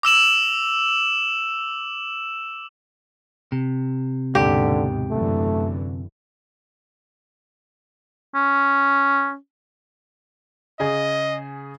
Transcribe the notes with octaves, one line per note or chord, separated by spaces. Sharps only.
D6 E6 E7 F#7
C3
D#2 G#2 B2 D3 G4
F#2 D3 E3 A3
C#4
C#3 G#4 D#5 G#5